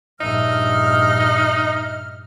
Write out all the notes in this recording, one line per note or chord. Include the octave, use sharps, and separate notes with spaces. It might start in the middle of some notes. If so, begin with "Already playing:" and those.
A#1 G2 D#4 E5 F6